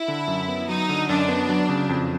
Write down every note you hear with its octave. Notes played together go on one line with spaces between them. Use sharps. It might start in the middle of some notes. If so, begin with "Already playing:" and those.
Already playing: E4
D3
F#2
B3
F#3 D#4
D3
F#2 D4
B3
F#3
C#3
F2